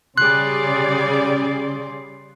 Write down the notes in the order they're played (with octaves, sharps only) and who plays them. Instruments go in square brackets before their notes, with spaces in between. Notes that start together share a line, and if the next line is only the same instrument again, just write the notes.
[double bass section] C#3 [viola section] G3 G#4 D5 [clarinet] C6 [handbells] F#6